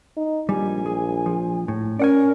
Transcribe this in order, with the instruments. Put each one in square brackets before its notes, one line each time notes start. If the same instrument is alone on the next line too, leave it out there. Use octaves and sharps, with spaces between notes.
[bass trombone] D#4
[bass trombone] A#1 [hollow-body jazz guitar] G3 [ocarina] G#5
[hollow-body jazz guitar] G#4
F3
A2
[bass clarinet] C#4 [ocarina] A#4 [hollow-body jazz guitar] D5 F#5 G#5